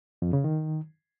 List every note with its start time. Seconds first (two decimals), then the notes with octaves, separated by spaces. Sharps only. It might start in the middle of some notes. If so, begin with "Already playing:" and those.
0.22 F2
0.33 C#3
0.44 D#3